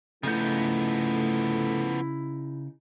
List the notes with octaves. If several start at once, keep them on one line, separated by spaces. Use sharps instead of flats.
C#3 F3 A3 B3 D#4 E4 G6